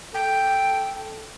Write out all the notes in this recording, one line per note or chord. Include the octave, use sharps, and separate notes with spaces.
A4 G5